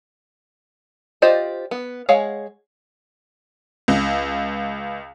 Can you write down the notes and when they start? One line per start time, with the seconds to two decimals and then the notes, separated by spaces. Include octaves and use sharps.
1.22 F4 G4 C5 D5 D#5
1.71 B3
2.09 G#3 G#4 C#5 F5 F#5
3.88 C#2